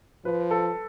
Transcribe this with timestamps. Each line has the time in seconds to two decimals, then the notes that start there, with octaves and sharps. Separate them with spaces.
0.25 F3 B4
0.51 A4